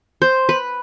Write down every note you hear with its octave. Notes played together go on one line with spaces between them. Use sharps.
C5
B4